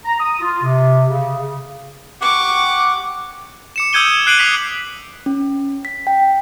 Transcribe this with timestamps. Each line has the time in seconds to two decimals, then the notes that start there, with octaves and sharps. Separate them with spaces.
0.05 A#5
0.20 D#6
0.41 F4
0.63 C3
1.09 C#3
1.37 C#3
2.21 G4 F#5 C#6 D6
3.76 D6 C#7 E7
3.93 D#6 E6 G6 G#6 D#7 G7
4.07 D#6
4.26 D#6 F#6 C7 D7 D#7 F#7
4.38 D6 D#6 B6 F7 F#7
5.26 C#4
5.85 B6
6.07 G5